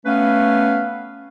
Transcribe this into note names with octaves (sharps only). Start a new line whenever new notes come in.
A3 B3 C#4 B4 F5